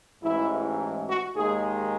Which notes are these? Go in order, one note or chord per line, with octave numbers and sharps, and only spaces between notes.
A1 G#2 E3 G#3 E4
F#4
D#2 D#3 G#3 G#4